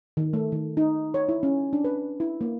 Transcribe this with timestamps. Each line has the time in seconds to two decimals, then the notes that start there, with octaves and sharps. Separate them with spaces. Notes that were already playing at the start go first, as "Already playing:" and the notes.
0.17 D#3
0.33 A3
0.52 D#3
0.77 D#4
1.14 C#5
1.29 E4
1.43 C#4
1.73 D4
1.84 B4
2.20 E4
2.41 A#3